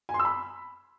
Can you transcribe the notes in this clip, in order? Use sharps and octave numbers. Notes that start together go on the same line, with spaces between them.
G#5
C6
E6
B5